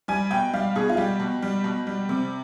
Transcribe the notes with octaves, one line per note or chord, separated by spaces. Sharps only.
G3 G#5
B2 G5
G3 F5
B2 G#4
F4
G3 G4
B2
G3
B2
G3
C3